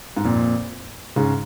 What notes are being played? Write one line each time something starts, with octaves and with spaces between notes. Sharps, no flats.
G#2
F2 A#2
G#2 C#3